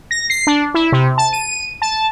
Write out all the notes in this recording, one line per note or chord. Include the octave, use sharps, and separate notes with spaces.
A#6
C7
D4
E4
C3
A5
D#7
A5